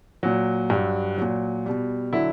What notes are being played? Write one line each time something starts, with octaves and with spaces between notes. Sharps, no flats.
A#2 F#3
G2 F#3
A#2 F#3
B2 G3
D3 F#3 E4